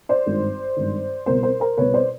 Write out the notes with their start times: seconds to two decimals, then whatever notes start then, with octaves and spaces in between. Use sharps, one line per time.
0.09 C5 D5
0.26 G#1 G2 D#3
0.76 G#1 G2 D#3
1.26 C2 B2 A#4 C5
1.43 A#4 C5
1.60 A#4 C5
1.78 C2 B2 B4 C#5
1.94 C5 D5